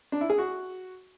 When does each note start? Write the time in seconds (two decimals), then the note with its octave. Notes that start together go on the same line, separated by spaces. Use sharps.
0.12 D4
0.21 E4
0.30 G#4
0.38 F#4